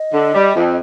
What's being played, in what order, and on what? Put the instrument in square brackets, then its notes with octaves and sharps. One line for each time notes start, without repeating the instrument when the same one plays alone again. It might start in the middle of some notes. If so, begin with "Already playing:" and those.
Already playing: [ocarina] D#5
[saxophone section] D3
G3
F2